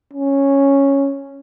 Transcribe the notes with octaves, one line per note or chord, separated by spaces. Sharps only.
C#4